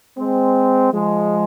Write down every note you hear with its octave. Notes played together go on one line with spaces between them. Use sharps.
G#3 C4
F3 G#3